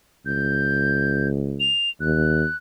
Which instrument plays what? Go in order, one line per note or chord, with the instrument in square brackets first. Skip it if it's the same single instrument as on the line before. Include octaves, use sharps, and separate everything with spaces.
[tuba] C#2 [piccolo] G6
[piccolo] F7
[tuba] D#2 [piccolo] F#6